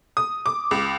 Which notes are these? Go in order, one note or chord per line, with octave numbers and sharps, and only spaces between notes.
D#6
D6
C#2